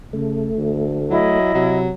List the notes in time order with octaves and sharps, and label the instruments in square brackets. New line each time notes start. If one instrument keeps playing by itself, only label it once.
[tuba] C#3 [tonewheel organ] A3
[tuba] D2
[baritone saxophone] F#3 [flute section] E4 D#5
[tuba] C3 [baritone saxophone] F#3